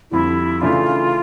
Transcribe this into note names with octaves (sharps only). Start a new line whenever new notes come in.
F2 D3 G3 E4
C#3 E3 A3 D4 F4